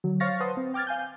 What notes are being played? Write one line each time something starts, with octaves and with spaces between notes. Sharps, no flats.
D3 F#3
C5 C#5 F5 C#6 A6 A#6
B4 C5 F#5 A5 C6 D#6
C4
G5 D6 F6 G#6 A6
F5 G#5 G6